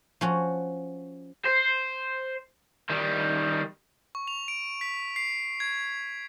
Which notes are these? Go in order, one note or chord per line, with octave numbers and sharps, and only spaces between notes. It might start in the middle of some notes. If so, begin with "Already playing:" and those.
F3 C#4 F#4
C5
D#3 G3
C#6
F7
D7
B6
C7
G#6